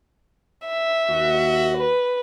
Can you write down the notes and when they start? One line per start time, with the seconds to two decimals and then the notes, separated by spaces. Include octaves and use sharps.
0.67 E5
1.09 D#2 F#4
1.77 B4